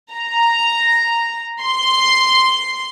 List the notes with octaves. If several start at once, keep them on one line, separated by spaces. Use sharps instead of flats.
A#5
C6